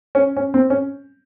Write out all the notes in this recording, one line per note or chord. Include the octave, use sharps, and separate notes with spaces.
C#4
C#4
C4
C#4